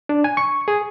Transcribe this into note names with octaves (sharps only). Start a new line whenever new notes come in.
D4
G#5
C#6
G#4